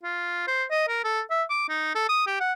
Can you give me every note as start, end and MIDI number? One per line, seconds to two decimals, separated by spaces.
0.03 0.45 65
0.47 0.64 72
0.71 0.88 75
0.88 1.03 70
1.04 1.21 69
1.31 1.43 76
1.50 1.65 86
1.69 1.94 63
1.95 2.04 69
2.09 2.26 87
2.27 2.36 67
2.40 2.53 78